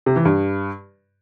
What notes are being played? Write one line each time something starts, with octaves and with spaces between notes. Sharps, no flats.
C3
E3
G2